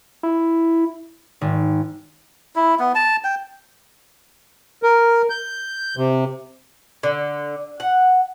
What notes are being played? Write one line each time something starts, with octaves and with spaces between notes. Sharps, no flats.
E4
G#1
E4
B3
A5
G5
A#4
G6
C3
D3
F#5